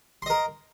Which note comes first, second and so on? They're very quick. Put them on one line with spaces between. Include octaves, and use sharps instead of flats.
C6 D#5 A#4